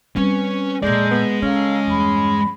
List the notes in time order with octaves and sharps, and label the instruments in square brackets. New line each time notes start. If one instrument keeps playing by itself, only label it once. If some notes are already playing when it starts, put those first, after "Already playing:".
[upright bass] G3 C4 [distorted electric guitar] C#4 [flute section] B4
[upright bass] F2 A#2 [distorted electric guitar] G#3 [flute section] A4 A#5 G6 [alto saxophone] D5
[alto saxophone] B3
[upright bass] C#3 [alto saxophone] C#4 [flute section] A4 F5 A#5
[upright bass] E2 G2 [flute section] B5